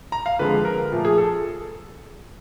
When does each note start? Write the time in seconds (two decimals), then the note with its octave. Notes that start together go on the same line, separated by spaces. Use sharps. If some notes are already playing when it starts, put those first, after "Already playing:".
0.12 A#5
0.26 F5
0.39 D3 F3 G#3 C4 B4
0.65 A#4
0.92 A#2 F3 A3
1.05 G#4
1.18 A4